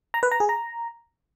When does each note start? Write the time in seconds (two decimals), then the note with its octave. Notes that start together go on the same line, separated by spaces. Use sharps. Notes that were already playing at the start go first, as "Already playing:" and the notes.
0.14 A#5
0.23 B4
0.31 A#5
0.40 G#4
0.49 A#5